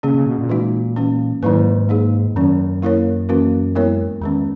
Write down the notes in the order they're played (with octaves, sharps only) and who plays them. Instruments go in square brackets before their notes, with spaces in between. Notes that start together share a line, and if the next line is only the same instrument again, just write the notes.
[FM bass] C#3 [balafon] A#3 C#4 G#4
[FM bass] C#3
B2
A#2
[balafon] E3 G#3 D#4 F#4
E3 A#3 C#4
[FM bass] G#2 [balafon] D#3 F#3 A#3 E4 B4
[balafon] A#3 D#4 G#4
[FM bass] F#2 [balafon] D#3 F#3 C#4
[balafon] A#3 E4 A#4 C#5
E3 A#3 C#4 F#4 A#4
G#3 B3 E4 A#4 C#5
[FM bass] E2 [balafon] D#3 G#3 C#4